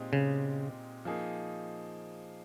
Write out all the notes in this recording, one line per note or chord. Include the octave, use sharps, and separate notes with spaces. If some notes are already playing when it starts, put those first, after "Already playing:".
Already playing: A#2 G#3 C4 D#4 G4
C#3
F3 A#3 D#4 G#4